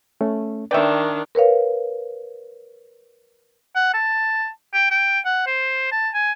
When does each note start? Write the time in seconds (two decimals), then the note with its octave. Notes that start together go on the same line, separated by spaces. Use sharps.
0.21 A3 C#4
0.71 D#3 D4 B4 D5 E5 G5 C#6
1.35 A#4 B4 C#5 F5
3.76 F#5
3.94 A5
4.74 G5
4.91 G5
5.25 F#5
5.47 C5
5.92 A5
6.14 G#5